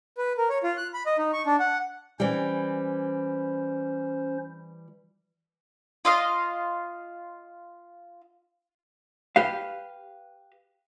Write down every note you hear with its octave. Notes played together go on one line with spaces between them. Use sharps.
B4
A#4
C#5
F4
F#6
B5
D#5
D#4
C#6
D4
F#5
E3 G3 C#4 C5
F4 D#5 F5
G4 B4 F5